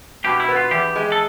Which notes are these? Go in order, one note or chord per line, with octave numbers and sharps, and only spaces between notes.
B2 G4
E4
B3
F4
E2 G4
G#3
A4